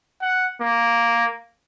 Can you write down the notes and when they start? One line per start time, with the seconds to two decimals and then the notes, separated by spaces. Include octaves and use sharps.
0.21 F#5
0.61 A#3